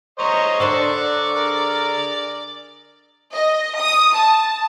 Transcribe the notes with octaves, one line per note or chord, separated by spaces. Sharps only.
C5 C#5 D#5 A#5
D3 D4 A#4 C5 D5 F#5 C#6
G#4 A#4
D#5
D#6
A5